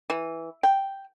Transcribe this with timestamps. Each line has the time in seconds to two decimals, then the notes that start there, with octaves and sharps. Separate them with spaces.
0.10 E3
0.63 G5